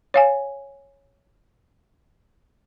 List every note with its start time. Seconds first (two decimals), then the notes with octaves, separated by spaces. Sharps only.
0.14 C#5 F5 G#5